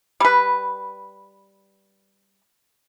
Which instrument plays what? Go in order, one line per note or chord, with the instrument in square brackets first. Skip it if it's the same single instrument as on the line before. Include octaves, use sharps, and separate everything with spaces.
[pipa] G3 B4